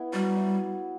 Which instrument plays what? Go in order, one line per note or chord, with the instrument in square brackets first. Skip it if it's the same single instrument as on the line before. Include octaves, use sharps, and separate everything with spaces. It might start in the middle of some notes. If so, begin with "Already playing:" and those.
Already playing: [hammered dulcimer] B3 E4
[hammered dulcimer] F#3 [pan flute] G3
[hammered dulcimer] E4